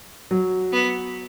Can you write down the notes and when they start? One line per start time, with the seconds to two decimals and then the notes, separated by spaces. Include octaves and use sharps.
0.31 F#3
0.73 B3